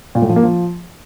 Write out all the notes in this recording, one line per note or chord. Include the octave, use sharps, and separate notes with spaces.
A#2
A2
F3
A#3
F3